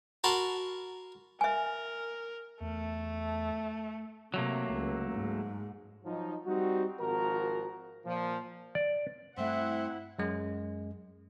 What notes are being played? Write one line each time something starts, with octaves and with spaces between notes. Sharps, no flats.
F#4 A#4 A5 B5 C6
A#4 E5 G#5
E2 A3
C3 F#3 A3 A#3
C#2
G#2
F3 F#3 D#4
G3 C4 D#4 F#4
G#1 D#3 F3 F#4 A#4 A#5
A#2 F3
D5
G2 A3 C4 E4 E5 F#5
F#2 G#3